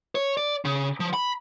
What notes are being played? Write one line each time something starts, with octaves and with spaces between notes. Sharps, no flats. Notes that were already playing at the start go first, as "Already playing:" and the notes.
C#5
D5
C#3
F3
B5